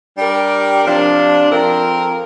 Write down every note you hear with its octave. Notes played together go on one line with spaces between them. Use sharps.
G3 D4 G4 A#4
C3 F3 D4
F2 F3 C4 A#4